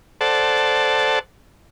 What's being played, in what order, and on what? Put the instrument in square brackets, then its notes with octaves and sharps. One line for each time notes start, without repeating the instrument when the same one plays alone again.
[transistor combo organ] A4 C5 D5 F#5 A5